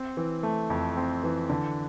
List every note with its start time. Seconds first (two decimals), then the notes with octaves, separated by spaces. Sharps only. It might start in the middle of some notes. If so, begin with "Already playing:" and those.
Already playing: C4
0.17 E3
0.43 A3
0.70 F2
0.97 C4
1.23 E3
1.50 D3